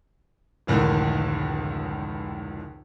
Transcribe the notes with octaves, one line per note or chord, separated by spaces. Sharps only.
F1 C#2 A2 D3 D#3